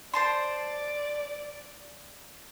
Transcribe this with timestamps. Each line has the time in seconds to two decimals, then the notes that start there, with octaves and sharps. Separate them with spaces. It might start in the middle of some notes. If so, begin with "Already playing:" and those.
0.14 C5 D5 A5 C6